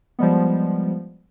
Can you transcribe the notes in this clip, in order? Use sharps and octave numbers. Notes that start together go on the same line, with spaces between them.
F3 G3 G#3 B3